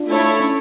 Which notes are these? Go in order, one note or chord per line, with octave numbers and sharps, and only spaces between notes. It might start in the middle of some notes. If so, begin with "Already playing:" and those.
Already playing: D4 F4
A3 E4 A4 C#5
C#4